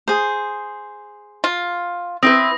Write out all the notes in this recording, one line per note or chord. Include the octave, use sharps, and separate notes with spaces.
G#4 C5
F4
C4 E4 B4 D#6 A#6